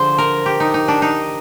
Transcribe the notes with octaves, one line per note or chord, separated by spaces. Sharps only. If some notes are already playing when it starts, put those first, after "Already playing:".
Already playing: D3 F3 G#4 C5
A#4
G4
D#4
D#4
D4
D#4